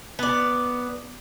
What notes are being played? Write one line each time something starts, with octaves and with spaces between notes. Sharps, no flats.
B3 D5